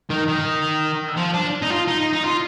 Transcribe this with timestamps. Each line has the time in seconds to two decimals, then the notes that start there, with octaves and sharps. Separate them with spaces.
0.10 D#3
0.28 D#3
1.17 F3
1.34 D4
1.62 D#4
1.70 F4
1.88 D#4
2.13 D#4
2.24 F4